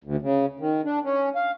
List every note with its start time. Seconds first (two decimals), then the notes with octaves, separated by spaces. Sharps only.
0.04 D2
0.22 C#3
0.60 D#3
0.85 D4
1.04 C#4
1.36 F5